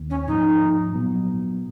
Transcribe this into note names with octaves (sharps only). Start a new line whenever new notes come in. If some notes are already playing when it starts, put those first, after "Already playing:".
Already playing: D#2 D#3 A#3
C#4
G#2 F3 A#3 D#4
A#2 F#3 B3